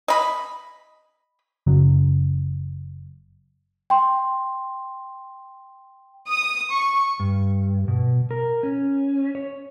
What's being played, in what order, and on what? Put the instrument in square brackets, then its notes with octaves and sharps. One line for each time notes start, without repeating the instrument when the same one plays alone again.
[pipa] D#5 B5
[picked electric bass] F#1 C#3 F#3
[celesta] G5 C6
[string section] D#6
C#6
[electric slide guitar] G2
B2
A#4
C#4
C#5